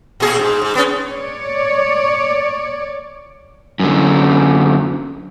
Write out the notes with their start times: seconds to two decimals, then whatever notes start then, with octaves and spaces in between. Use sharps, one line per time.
0.20 A#2 G#4
0.39 G#2
0.61 G#2
0.75 B3 C#4
1.10 C#5 D5
3.80 F#2 D3